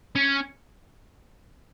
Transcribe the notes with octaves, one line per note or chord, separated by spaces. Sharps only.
C#4